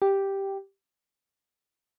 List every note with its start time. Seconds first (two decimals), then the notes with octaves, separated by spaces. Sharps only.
0.02 G4